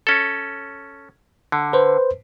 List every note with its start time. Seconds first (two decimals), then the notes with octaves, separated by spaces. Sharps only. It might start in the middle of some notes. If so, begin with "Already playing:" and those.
0.07 C#4 A4
1.52 D3
1.73 B4 C5